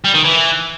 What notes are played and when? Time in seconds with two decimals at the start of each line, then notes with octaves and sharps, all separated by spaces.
0.04 G3
0.14 D#3
0.25 E3